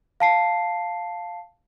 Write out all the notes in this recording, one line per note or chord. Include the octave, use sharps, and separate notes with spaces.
F5 A5 C7